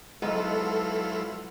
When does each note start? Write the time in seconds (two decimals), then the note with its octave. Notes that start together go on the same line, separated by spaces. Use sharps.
0.22 G#2 F#3 G#3 B3 E4 F4 A4 D#5